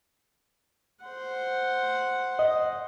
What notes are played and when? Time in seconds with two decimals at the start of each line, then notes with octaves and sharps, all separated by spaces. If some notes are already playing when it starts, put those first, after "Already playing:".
1.05 C5 F#5
2.39 D#5